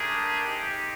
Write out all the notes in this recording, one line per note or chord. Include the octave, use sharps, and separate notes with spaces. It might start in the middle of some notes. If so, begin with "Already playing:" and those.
Already playing: A3 D4 G4 G#4 A#4
C4 D#4 G4